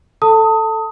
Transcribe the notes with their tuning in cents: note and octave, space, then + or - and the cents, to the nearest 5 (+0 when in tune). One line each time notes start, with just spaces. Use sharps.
A4 +0 A5 +30 D#6 +20